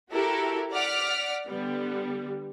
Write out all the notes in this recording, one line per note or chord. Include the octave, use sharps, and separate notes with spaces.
E4 F#4 G4 A4 A#4
D5 F#5 D6 F6 B6
D3 G3 B3